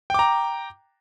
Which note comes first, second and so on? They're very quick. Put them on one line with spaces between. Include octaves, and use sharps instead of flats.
G5 D6 A#5